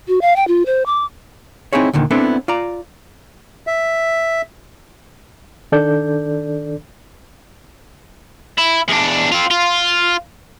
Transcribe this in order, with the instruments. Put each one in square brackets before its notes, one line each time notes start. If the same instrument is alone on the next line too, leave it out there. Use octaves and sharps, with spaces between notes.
[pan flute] F#4
F5
G5
F4
C5
D6
[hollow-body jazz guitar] C4 D#4 E4 G#4 C#5
D2 A#2 D3 D#3
B3 C4 D4 E4 A4
F4 D5 A#5
[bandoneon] E5
[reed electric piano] D#3 D4 A4 D5 G6
[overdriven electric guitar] E4
E2 D4
C4 F4
F4